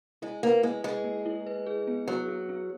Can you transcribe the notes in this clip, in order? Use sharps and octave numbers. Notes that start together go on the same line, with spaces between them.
G#3 E4
A#3 B4
G#3 E4
G#3 G#4
A#3
E4
B4
G#4
B3
F#3 B3
B3
B3